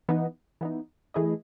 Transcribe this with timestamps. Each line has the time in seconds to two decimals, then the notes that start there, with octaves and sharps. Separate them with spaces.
0.09 E3 B3 D#4
0.61 E3 B3 D#4
1.14 E3 A3 E4 G#4 D#5